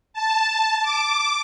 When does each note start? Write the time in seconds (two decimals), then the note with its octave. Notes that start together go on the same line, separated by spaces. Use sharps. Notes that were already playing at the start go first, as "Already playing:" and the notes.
0.13 A5
0.82 D6